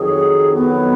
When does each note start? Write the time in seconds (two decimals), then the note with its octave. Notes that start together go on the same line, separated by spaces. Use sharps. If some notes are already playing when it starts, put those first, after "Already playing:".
Already playing: F2 D#3 F#3 G#4
0.54 B3